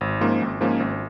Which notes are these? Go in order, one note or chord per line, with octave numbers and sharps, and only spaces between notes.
G#1
G#2 F3 A#3 C#4
G#1
G#2 F3 A#3 C#4
G#1